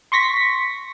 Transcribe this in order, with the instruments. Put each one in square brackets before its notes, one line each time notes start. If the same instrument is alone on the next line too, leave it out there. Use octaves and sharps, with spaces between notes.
[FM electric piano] C6 C#6 A#6 B6